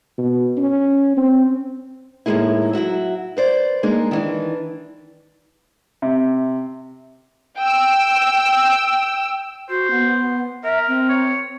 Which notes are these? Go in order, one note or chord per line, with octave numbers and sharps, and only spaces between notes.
B2
C#4
C4
A2 D#3 E3 G#3 A#3 E4
F#3 E4 F#4 E5
B4 C5 D5
G#3 A#3 D4 D#4
D#3 E3 D4
C3
G5 E6
F#4 C5
B3
A#4 E5
C4
C#5